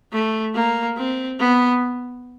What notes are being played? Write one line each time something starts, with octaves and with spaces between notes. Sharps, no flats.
A3
A#3
C4
B3